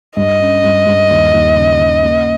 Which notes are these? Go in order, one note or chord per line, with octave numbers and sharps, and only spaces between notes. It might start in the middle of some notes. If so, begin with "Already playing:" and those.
G2 D#5
C#4
G2
G2
D#2
D#2
C#3
C#3
A#3